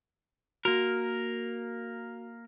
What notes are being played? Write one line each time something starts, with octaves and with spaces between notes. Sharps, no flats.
A#3 F#4 A#4